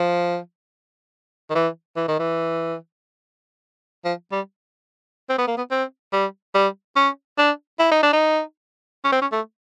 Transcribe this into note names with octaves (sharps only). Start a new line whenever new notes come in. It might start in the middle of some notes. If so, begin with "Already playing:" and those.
Already playing: F3
D#3
E3
E3
D#3
E3
F3
G3
C4
B3
A#3
B3
C4
G3
G3
C#4
D4
E4
D#4
D4
D#4
C#4
C4
C#4
A3